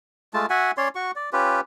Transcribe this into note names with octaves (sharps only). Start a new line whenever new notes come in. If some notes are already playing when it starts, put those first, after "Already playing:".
G#3 A3 F4 A5
F#4 E5 F#5 G#5
C#4 C#5 D5 C6
F#4 C#6
D5
C#4 F4 G4 B4